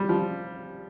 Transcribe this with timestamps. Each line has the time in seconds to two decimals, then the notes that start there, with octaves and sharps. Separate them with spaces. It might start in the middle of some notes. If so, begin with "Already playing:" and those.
Already playing: G3
0.09 F3